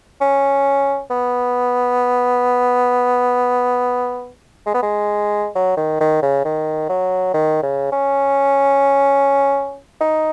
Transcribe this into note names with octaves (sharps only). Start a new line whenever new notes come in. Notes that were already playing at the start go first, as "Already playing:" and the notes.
C#4
B3
G#3
B3
G#3
F#3
D#3
D#3
C#3
D#3
F#3
D#3
C#3
C#4
D#4